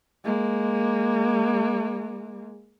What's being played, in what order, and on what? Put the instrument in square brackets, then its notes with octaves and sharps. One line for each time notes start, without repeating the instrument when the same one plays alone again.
[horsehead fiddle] G#3 A#3